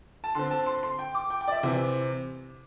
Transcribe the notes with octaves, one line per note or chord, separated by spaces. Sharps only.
A5
D3 C4 C6
A5
C6
C6
G5
D6
G5
G5
D5
E5
C3 E3 C4